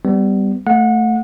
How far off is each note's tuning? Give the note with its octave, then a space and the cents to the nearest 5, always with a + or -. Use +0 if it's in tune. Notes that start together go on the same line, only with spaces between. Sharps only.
G3 +0 B3 +35
A3 +5 F#5 -30